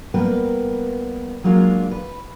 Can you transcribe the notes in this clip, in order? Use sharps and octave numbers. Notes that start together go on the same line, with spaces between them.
G3 A#3 B3 A#4 B4 G5
F#3 G#3 A#3 D4 F4
B4